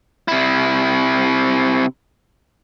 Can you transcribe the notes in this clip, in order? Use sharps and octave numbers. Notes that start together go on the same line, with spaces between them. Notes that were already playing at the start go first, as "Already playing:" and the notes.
C3 E4